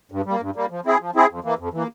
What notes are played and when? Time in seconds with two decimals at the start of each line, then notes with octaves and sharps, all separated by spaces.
0.12 G2
0.26 G3
0.31 A#3
0.41 G2
0.56 G3 A#3
0.70 F3
0.85 C4 E4 G#4
1.01 F3
1.15 C4 E4 G#4
1.30 F2
1.44 E3 A#3
1.59 F2
1.73 E3 A#3